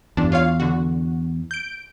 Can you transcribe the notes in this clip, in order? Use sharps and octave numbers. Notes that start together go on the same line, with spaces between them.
E2 G2 D4
F4 C#5 F5
D3 F#4
G6 D7